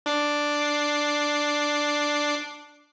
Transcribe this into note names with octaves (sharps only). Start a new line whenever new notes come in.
D4 D6 C7